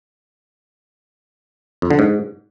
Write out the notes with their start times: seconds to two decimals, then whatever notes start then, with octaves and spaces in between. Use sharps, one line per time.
1.82 F2
1.90 D3
1.99 G#2